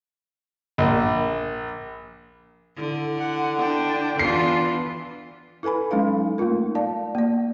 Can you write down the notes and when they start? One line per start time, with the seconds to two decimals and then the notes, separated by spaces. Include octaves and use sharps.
0.78 A#1
2.77 D3 E4
3.18 F#5
3.58 D4 G5
4.19 E3 B3 D4 F4 C7
5.63 E4 A4 B4 G#5 B5
5.91 F#3 G#3 C#4 D#4 A4 F5
6.38 A3 A#3 D#4 F4 A#4
6.75 D5 F5 A5
7.15 A#3 D5